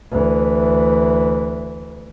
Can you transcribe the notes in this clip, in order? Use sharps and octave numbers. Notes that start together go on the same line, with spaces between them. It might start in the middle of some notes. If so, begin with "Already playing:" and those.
D2 E3